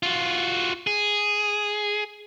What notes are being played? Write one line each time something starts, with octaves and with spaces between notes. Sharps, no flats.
F4 F#4
G#4